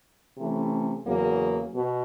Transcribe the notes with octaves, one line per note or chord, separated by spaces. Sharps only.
C3 E3 A3 C#4
E2 C#3 F#3 A#3
B2